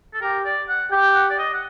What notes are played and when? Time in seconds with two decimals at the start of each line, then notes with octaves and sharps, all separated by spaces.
0.13 A4
0.22 G4 A#4
0.45 D5
0.69 F#5
0.91 G4 G5
1.14 F#5
1.30 D5
1.38 D#5
1.54 F#5